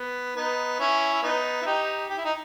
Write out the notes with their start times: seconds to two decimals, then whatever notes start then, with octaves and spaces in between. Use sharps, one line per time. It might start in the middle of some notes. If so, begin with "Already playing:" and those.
Already playing: B3
0.36 B3 D#4
0.79 C#4 E4
1.13 E4
1.23 B3 D#4
1.62 E4
1.66 D#4 G4
2.09 G4
2.17 E4
2.25 D#4